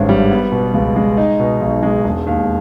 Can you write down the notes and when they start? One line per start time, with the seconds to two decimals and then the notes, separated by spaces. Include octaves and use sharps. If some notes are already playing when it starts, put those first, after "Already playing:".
Already playing: G#1 G2 C#4
0.09 G3
0.31 B3
0.52 B2
0.74 C#2
0.96 G#3
1.17 D#4
1.40 B2
1.61 B1
1.83 G#3
2.04 E1
2.27 D#2